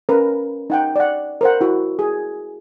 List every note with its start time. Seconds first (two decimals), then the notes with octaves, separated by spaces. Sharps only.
0.09 C#4 A#4 B4
0.70 D#4 F#5 G5
0.96 D5 F#5
1.41 A#4 C5 F#5
1.61 E4 F#4
1.99 G#4